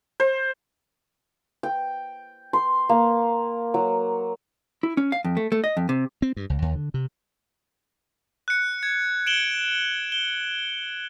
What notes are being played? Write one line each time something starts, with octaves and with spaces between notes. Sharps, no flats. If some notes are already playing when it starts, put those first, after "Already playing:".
C5
G5
C6
A#3
F#3
E4
C#4
F5
F2
A3
A3
D#5
F2
C3
C4
G2
C#2
D#2
D3
C3
F#6 C#7
G#6
D7 E7 F#7 G7
G7